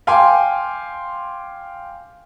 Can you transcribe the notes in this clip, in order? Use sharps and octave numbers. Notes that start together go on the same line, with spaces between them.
F5 G5 G#5 C6 D6